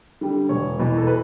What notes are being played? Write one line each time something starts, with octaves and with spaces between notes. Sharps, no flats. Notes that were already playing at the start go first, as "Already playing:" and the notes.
D3 G3
E1 C#5
E2 B2
A4
B4